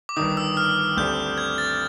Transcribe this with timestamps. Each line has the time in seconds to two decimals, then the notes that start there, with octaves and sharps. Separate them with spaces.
0.09 D6
0.17 G1 G2 D#3 D#6
0.37 E6
0.57 F6
0.97 D2 D3 G3 C4 G6
1.38 G#6
1.58 A6